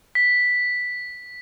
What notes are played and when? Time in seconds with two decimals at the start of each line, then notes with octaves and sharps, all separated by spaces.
0.15 B6